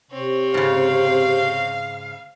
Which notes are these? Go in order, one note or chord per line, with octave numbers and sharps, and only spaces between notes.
C3 C4 C#5
G#2 C#3 F5